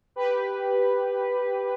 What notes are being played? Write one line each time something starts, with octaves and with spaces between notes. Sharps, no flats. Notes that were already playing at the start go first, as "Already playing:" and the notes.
G4 B4